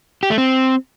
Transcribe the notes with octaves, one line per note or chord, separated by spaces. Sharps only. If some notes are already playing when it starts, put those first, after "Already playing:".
G4
A3
C4